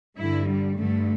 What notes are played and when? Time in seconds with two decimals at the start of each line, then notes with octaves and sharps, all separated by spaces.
0.18 G2 D3 E4
0.48 G3
0.78 G2 D3 A3